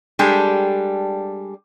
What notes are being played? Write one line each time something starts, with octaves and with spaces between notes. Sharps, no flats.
G3 G#3 D4 G4 A4